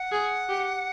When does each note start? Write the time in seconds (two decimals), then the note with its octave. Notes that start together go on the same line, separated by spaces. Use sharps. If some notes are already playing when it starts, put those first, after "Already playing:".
Already playing: F#5
0.12 G#4
0.49 G4